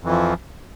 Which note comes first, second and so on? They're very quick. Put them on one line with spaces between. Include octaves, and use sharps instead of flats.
F2 E3 F3